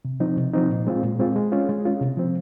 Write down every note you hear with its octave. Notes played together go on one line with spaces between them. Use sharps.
C3
F3 C4 D#4
C3
F3 C4 D#4
A#2
G#3 C4 F4
A#2
G#3 C4 F4
G#3
C#4 F4
G#3
C#4 F4
C3
F3 C4